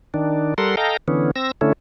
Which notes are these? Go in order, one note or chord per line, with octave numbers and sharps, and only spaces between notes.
D#3 D4
G3 A4 A#4 F#5 C6
A4 D#5 F5 G5 A#5
D3 E3 B3 C#4
C4 E6 A#6
D3 A3 C#4 E4